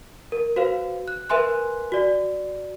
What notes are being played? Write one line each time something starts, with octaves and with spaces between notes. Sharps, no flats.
A#4
F#4 B4 C5 F5
F#6
A#4 B4 E5 G#5 C6 F#6
F#4 D5